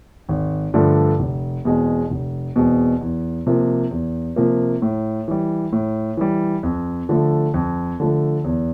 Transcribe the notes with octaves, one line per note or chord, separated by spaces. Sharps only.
G#1
G2 D3 F3 A3
F1
E2 B2 G#3 C4
F1
E2 B2 G#3 C4
E2
C3 F3 A#3
E2
C3 F3 A#3
A2
E3 G3
A2
E3 G3
F2
D3 F3 A3
F2
D3 F3 A3
E2